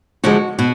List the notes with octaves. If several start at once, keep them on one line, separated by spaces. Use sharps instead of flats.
D3 F3 G#3 F#4
B2 F#4